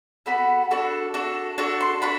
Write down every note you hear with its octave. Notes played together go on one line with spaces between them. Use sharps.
B3 F#4 A4 B5
D4 F#4 A4
D4 F#4 A4
D4 F#4 A4
C6
D4 F#4 B5